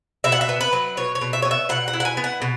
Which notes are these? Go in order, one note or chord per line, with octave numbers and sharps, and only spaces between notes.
B2 E5
F#5
E5
B3
B4
F#3
B2 C#5
C#5
B2
E5
B3 C#5
E5
B2 F#5
F#5
E4
F#5
G#5
B3
F#5
B2